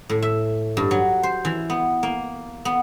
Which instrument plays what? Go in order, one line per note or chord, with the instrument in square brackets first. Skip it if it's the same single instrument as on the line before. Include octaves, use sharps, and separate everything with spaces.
[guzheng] A2
E5
G2
F#3
C5
E3
B3
A#3
B3